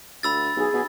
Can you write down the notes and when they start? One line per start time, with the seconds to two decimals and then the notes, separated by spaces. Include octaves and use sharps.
0.23 D2 B5 E6 A6
0.56 B1 G#4
0.74 B2